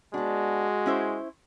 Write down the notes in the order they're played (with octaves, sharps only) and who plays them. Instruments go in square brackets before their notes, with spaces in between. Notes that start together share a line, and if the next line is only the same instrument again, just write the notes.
[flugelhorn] G#3 [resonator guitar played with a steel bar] B3 D4 [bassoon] F#4
[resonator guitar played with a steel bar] C#4 E4 C5